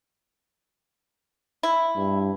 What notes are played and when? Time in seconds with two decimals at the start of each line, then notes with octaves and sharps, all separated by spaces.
1.63 E4
1.96 G2